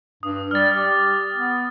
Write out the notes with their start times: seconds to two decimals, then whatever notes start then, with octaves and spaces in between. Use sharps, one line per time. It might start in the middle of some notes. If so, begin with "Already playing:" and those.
0.23 G2 D#6
0.51 G3 F6 A6
0.76 G4
1.36 B3